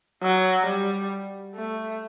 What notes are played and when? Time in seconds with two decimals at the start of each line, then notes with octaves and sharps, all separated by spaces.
0.22 F#3
0.66 G3
1.55 A3